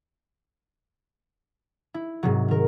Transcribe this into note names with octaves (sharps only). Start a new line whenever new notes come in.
E4
G#2 C3 F#3
D#3 A#4